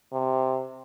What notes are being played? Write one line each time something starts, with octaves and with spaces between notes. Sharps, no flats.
C3